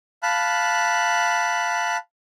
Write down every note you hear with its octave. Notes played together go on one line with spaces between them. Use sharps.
F5 A5 B5 F#6